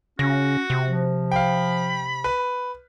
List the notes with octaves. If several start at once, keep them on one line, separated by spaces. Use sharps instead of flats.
C#3 C#4 F#4 A#6
C3
F3
F5 G5 B5
B4